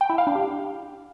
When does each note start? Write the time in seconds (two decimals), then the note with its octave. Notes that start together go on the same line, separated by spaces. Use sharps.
0.01 G5
0.09 E4
0.18 F5
0.27 D4
0.35 G4